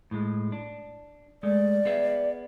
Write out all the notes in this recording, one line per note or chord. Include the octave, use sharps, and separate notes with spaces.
A2 G#3
D4
G#3 A3 D5
B3 G#4 E5